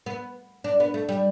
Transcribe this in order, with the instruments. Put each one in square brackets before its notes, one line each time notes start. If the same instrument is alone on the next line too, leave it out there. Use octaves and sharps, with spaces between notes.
[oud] B3
D4
B3
A3
G3